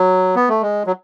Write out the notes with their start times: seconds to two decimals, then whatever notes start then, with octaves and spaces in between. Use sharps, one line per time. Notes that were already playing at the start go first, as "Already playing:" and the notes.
Already playing: F#3
0.36 B3
0.49 A3
0.62 G#3
0.87 F#3